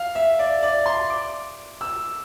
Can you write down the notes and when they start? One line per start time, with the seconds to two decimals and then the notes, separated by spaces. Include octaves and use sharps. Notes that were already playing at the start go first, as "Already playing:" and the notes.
Already playing: F5
0.15 E5
0.39 D5
0.63 D5
0.86 C6
1.10 D6
1.81 E6